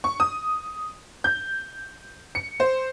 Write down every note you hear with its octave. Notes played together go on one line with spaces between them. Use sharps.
C#6
D#6
G6
C#7
C5